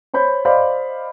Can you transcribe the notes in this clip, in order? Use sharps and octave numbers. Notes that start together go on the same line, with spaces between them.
C5 C#5 B5 G6
C5 D5 D#5 F5 B5